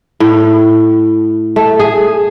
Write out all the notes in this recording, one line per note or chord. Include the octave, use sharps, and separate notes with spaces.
A2
A3
G#4